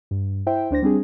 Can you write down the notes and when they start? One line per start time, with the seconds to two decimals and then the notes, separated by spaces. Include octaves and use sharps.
0.11 G2
0.47 E4 C5 E5 G5
0.71 D2 D4 C5 A#6
0.82 G3 C4 D4 G#4